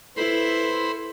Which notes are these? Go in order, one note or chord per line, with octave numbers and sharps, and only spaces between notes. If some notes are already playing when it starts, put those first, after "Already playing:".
E4 A4 B4 C5 B5 C6